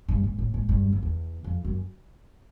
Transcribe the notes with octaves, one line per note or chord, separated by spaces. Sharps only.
G2
G#2
A2
G#2
G2
E2
F2
E2
F2
F#2